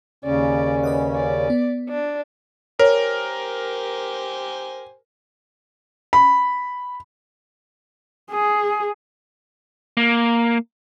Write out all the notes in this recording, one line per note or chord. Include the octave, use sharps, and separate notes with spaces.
D#2 C#3 C#4 D5
B4 D#5 F#5
D5
B3
D4
G4 A#4 C5 C#5 G#5
B5
G#4
A#3